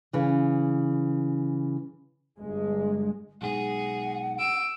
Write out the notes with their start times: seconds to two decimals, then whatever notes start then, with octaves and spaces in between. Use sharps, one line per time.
0.13 C#3 E3
2.38 G1 G#3
3.41 B1 G#2 G#4 F#5
4.39 E6 D7